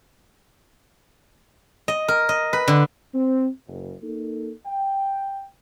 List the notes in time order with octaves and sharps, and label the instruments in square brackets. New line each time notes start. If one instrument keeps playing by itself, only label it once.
[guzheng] D#5
A#4
D#5
B4
D3
[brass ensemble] C4
F#1
A#3 D#4 A4
G5